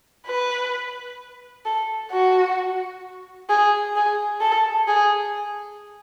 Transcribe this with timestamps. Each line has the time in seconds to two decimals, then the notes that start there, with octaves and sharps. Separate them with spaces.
0.26 B4
1.65 A4
2.12 F#4
3.50 G#4
3.96 G#4
4.41 A4
4.88 G#4